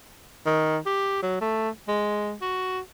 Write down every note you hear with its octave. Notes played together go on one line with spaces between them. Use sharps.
D#3
G4
F#3
A3
G#3
F#4